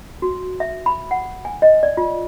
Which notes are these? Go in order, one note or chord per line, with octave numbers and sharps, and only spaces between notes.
F#4
E5
B5
F#5
G#5
D#5
D5
F4